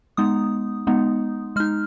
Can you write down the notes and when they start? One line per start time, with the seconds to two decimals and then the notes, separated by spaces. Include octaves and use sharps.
0.17 G#3 B3 D#4 D#6
0.87 G#3 B3 D#4
1.56 G#3 D#4 F6